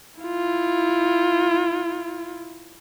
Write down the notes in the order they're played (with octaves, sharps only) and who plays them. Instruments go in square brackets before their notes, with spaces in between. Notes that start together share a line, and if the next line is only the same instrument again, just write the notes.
[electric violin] E4 F4